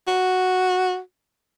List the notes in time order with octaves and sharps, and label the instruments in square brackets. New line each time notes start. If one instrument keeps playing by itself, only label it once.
[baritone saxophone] F#4